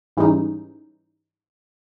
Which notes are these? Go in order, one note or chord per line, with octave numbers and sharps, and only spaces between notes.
G#2 E3 G3 G#3 C#4 D#4